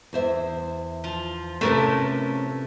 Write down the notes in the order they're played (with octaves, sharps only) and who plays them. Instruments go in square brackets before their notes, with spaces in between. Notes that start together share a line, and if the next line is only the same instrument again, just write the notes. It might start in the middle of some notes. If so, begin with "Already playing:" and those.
[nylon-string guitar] E2 C5 E5
[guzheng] F3 F4
[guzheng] A2 C3 [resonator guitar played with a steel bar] A3 A#4 [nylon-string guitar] C#4 B4